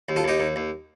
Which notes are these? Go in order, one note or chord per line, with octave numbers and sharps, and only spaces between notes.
D#2
F4 A4
D#2 D#4 G4
D#2
D#2